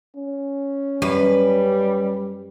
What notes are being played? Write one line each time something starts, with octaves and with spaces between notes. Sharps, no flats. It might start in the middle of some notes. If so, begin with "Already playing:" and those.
C#4
F#2 G3 B4